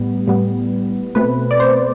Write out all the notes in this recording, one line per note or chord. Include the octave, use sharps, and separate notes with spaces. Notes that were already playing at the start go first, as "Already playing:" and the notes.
Already playing: A2 G3 B3
A2 G3 B3
B2 A3 C4 B4
D5
C5